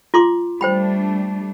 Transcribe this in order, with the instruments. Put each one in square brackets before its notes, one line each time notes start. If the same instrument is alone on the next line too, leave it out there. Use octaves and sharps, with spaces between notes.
[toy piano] F4 C6 D6
[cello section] G3 A3 D4 [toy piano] C5 G5 B5